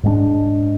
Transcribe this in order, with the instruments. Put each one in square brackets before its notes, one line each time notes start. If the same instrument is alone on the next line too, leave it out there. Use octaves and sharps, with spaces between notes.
[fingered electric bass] G#2 G#3 B3 D4